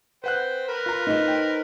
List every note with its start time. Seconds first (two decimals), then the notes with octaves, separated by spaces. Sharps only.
0.24 B4 C5 F#5 G5 F#6
0.68 A#4 B4
0.86 F4 A#5
1.07 D#4 C5
1.28 G5